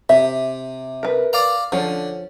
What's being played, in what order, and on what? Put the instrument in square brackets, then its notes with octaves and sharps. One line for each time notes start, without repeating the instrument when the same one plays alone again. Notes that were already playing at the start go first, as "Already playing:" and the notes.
[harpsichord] C3 [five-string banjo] E5
[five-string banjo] A#4 B4
[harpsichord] D5 F5 A#5
[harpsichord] D3 [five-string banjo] F3 C#4